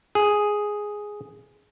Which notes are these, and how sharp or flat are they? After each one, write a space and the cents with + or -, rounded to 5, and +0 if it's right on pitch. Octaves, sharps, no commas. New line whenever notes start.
G#4 +0